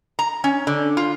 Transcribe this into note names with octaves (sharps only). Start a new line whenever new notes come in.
A#5
C#4
D3
F4